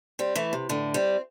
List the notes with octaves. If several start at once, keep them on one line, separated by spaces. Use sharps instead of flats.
G3 C4
E3 A3
C3
A2 D3
G3 C4